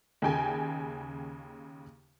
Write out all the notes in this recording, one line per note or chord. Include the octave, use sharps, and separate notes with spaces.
D#2 C#3 G5 G#5